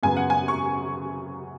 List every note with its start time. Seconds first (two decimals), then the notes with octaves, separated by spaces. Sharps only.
0.03 F#2 C#3 F#3 B3 G#5
0.17 F#5
0.30 G#5
0.48 C#6